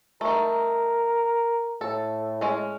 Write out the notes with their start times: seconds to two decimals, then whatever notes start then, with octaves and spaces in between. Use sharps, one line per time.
0.21 A3 D#4 A#4
1.81 A2 A4
2.41 G#3 C#4